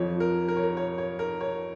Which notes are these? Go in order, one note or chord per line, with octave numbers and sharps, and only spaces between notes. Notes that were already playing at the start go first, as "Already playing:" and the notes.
Already playing: F2 F3 C#5
A#4
A#4
C#5
A#4
C#5
C#5
A#4
C#5